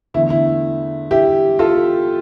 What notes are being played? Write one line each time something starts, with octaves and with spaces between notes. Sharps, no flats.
E2 D3 A3 E4
E4
E4 G4
F4 A4